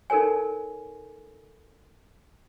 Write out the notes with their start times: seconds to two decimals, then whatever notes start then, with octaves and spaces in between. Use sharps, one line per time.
0.10 D#4 A4 A#4 C#5 G#5